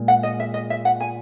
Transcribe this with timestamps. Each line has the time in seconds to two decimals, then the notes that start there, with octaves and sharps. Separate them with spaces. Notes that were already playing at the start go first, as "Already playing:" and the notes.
Already playing: A#2 G#3
0.08 F#5
0.23 D#5
0.40 E5
0.54 D#5
0.70 E5
0.85 F#5
1.00 G#5